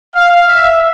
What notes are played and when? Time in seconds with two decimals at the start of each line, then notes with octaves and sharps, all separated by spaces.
0.14 F5
0.47 E5